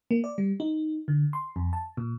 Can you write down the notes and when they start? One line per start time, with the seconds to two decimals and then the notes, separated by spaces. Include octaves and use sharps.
0.11 A#3
0.24 D5
0.38 G3
0.60 D#4
1.08 D3
1.33 C6
1.56 F2
1.73 A5
1.97 A#2